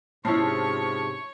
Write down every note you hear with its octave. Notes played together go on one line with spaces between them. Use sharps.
G#2 C3 F3 C#4 E4 C#5 C7